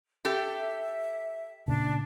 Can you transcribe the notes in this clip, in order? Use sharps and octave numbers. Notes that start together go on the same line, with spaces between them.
G4 A4 E5
A#2 C#3 D4 A5